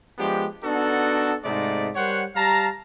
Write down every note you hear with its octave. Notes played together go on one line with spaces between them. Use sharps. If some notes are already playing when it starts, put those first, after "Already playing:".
F3 G#3 B3 D4 G4
B3 D4 D#4 F#4 A4
G#2 C3 G#3 A3 D#4 D5
G3 A#4 C5 C#5 F#5
G3 G4 F5 A5 A#5